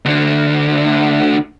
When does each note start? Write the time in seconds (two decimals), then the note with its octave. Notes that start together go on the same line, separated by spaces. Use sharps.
0.05 D2 D3